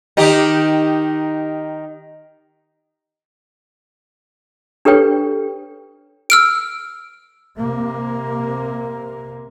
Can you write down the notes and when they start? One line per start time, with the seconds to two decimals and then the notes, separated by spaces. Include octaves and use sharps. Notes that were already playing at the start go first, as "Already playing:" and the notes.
0.17 D#3 D#4 G4
4.85 D4 G4 A4 B4 C#5 G5
6.30 E6 F6 D7
7.57 C3 A#3